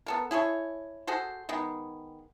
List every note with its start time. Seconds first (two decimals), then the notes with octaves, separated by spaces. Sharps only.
0.06 B3 A4 A#4
0.31 E4 G#4 A4 C#5
1.07 F#4 G#4 A4 C5
1.49 D#3 G#3 B3